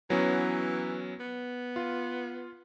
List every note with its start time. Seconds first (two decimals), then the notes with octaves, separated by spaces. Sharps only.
0.10 E3 F#3 B3 C#4
1.20 B3
1.76 F4